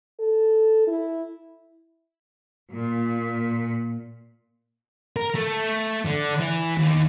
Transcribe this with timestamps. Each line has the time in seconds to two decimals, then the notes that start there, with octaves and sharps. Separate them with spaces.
0.19 A4
0.87 E4
2.71 A#2
5.16 A#4
5.35 A3
6.06 D3
6.41 E3
6.78 D#2